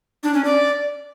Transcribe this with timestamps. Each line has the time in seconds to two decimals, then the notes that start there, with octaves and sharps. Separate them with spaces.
0.23 D4
0.34 C#4
0.45 D5